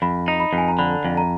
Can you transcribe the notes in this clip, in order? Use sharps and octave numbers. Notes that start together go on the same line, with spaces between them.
F2 B5
D#4
B5
F2
G#5
A#5
D3 B5
F2
A#5